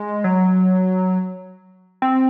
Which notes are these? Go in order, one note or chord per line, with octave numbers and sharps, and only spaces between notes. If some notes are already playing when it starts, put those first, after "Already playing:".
Already playing: G#3
F#3
C4